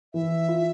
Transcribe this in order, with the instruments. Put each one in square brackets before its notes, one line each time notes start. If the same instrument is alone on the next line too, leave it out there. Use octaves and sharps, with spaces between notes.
[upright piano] E3 [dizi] E5
[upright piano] F4